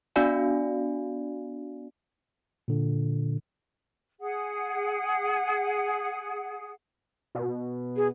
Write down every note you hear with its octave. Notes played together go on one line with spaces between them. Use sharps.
B3 D4 F#4 D5 F5 G#5
A#2 D3
G#4 F#5
B2
G#4